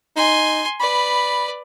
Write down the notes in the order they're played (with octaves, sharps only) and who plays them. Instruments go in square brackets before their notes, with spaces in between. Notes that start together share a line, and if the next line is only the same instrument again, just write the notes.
[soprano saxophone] D#4 [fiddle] G#5 C6
[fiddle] B4 D5 [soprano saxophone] B5